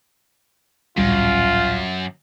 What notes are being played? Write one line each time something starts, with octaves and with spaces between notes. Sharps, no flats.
D1 A#1 F#2 G3 F4